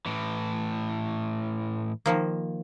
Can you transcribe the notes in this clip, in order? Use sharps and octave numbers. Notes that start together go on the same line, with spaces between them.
A2 E3
D#3 F3 A#3